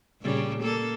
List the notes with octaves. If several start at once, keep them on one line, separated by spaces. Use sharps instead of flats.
A#2 C#3 G3
A#3 A4